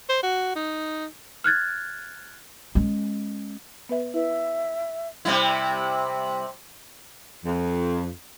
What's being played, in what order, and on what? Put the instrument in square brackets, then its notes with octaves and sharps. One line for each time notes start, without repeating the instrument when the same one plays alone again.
[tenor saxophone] C5
F#4
D#4
[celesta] F6 F#6 G#6 A6
[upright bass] G#3 C#4
[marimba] B3 B4 E5
[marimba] E4 B4 [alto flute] E5
[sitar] C3 G3 E4
[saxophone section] F2